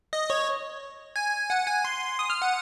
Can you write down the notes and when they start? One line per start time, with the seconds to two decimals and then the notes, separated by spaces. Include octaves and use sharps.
0.13 D#5
0.30 C#5
1.16 G#5
1.50 F#5
1.67 G#5
1.85 C6
2.19 D#6
2.30 F6
2.42 F#5